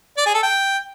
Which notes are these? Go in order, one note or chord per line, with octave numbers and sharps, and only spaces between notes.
D5
G#4
A4
G5